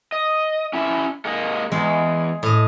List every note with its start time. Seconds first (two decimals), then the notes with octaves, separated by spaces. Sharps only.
0.12 D#5
0.73 C#4 E4 E5
1.25 G#3 A#3 D#4
1.72 E2 G#3
2.43 A2 D#5